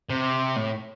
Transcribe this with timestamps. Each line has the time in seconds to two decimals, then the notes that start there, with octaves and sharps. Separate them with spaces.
0.09 C3
0.56 A2